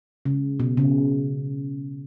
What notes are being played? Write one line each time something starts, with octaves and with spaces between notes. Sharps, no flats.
C#3
B2
C#3